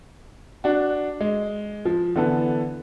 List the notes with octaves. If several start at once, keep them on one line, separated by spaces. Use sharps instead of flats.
D4 F#4
G#3
F3
D3 E3 B3 A4